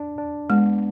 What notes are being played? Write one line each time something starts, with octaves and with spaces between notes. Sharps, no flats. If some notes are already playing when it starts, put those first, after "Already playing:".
Already playing: D4
D4
G#3 B3